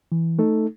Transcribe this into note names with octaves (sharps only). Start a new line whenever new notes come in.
E3
A3 D#4 A4